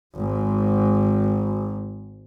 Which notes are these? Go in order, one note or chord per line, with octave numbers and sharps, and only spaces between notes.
G#1 G#2